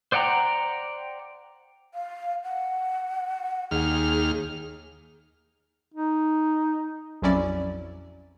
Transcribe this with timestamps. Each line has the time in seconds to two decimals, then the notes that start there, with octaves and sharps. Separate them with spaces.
0.12 C5 D5 F#5 G5 A#5
1.94 F5
2.44 F#5
3.71 D#2 G#4 F6
5.94 D#4
7.22 A#1 F2 F#3 C#4 E4 D5